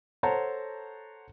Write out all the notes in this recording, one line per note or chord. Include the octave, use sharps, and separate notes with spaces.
A4 C5 C#5 F#5 A5 A#5